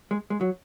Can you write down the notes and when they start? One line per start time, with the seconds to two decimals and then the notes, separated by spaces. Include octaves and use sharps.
0.11 G#3
0.30 G#3
0.41 F#3